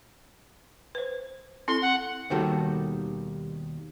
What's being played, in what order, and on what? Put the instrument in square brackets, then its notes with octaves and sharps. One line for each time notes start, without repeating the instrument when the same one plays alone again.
[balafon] B4 C5
[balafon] C4 E4 A4 [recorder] C6
[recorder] F#5
[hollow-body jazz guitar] D#2 B2 D#3 G3 F#4 A4